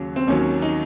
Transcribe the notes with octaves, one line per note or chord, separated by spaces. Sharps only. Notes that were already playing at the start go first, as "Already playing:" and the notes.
Already playing: D#2 C#3 F#3
C4
D#2 D#3 F#3 C#4
D#4